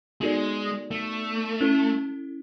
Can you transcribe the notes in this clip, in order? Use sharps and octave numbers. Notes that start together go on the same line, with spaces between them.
G#3 B3 D#4 F#4 A4 D5
A3
C#4 E4 A4